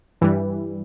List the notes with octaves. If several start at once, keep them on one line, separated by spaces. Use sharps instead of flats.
G2 E3 G3